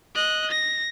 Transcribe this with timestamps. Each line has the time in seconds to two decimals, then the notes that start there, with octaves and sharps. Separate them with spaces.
0.15 D#5 F#6
0.51 A#6